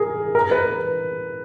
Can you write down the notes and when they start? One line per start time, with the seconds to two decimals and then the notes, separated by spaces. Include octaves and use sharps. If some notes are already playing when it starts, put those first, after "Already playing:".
Already playing: G#4 A#4
0.35 A#4
0.51 B4